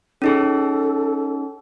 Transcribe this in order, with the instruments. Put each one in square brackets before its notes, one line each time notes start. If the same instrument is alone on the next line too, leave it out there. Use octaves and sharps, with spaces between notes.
[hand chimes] C#4 D#4 G#4 [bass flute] A4